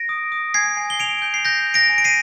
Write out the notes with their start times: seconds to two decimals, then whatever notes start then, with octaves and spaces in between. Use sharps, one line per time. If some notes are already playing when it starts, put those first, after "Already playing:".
Already playing: A#6 D7
0.09 D#6
0.32 D#6
0.54 G#5 G#6 C7
0.77 G#5
0.90 G7
1.00 G#5 D7 F7
1.22 G6
1.34 C7
1.45 G6 A#6
1.67 G6
1.74 A#6 D7
1.90 G#5
1.98 D7
2.04 C7 D#7